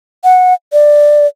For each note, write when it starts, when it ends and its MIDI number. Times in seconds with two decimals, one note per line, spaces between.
0.24 0.54 78
0.73 1.27 74